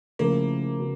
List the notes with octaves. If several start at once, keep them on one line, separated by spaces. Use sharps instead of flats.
C#3 F3 A3 A#3 C4 E4
C#3 F#3 B3